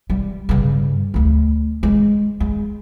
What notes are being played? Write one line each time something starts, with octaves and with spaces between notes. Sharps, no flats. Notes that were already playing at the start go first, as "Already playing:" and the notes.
G3
G2 C#3
D2 A3
D3 G#3
G#3